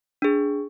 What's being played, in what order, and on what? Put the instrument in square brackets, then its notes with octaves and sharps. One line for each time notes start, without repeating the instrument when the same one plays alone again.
[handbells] D4 G#4